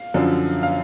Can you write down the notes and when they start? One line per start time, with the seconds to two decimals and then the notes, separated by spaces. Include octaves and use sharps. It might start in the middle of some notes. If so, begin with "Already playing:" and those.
Already playing: F5
0.14 F#2 D3 F3
0.63 F5